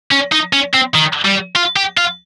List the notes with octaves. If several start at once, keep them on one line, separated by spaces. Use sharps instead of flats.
C#4
D#4
C#4
C4
D#3
G3
F4
G4
F4